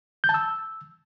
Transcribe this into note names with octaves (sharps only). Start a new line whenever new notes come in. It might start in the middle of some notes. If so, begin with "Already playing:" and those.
G6
A5
E6